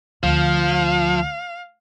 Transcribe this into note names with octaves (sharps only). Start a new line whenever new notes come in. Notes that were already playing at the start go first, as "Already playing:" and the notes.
D2 F3 F5